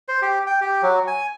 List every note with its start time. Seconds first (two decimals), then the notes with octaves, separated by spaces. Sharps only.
0.08 C5
0.22 G4
0.47 G5
0.61 G4
0.82 F#3
1.07 G#5